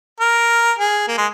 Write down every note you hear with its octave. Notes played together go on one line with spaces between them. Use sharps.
A#4
G#4
A#3
G#3